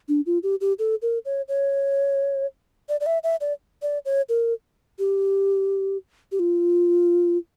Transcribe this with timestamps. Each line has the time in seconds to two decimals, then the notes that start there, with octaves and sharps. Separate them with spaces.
0.09 D4
0.26 F4
0.43 G4
0.61 G4
0.79 A4
1.02 A#4
1.25 C#5
1.48 C#5
2.89 D5
3.01 D5
3.06 E5
3.24 E5
3.41 D5
3.82 D5
4.05 C#5
4.29 A#4
4.99 G4
6.32 G4
6.39 F4